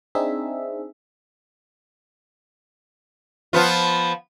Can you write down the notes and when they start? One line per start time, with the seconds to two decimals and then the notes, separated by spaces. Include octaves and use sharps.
0.15 C4 D4 D#4 G#4 E5
3.53 F3 B3 F4